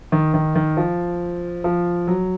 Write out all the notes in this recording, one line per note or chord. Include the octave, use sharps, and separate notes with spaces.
D#3
D#3
D#3
F3
F3
F#3